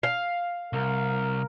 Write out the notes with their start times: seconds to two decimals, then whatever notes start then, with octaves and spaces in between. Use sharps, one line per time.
0.03 F5
0.73 C2 A#4